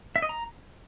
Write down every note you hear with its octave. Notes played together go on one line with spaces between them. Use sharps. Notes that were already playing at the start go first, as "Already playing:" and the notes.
E5
D#5
A#5